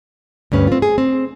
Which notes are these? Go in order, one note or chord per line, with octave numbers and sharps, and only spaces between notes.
D2 G2 C#4 B4
C4 F4
G#4
C4